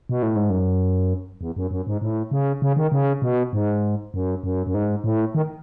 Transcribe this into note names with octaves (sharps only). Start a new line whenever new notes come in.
B2
A2
G#2
F#2
E2
F#2
F#2
G#2
A2
C#3
C#3
D#3
C#3
B2
G#2
F#2
F#2
F#2
G#2
A2
D#3